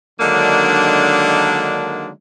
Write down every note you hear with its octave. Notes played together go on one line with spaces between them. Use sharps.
D3 D#3 F#3 G#3 A#3 D4